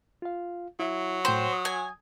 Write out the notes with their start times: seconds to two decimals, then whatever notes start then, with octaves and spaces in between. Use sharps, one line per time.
0.22 F4 F5
0.79 F#3 E4 E5
1.25 A2 C5 G5 C6
1.53 D#6
1.65 G#5